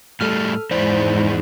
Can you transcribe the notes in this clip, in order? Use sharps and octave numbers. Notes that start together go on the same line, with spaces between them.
A2 G3 A3 A4 F6
E2 G#2 E4 C5 D5